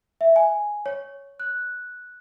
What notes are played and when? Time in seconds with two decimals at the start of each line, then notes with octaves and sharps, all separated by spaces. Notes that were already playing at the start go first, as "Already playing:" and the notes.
0.21 E5
0.36 G#5
0.86 C#5
1.40 F#6